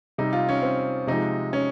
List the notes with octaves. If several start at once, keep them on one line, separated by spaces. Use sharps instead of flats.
C3 G3 D#4
F4
C#4
C4
C3 F3 G#3 D#4
C#4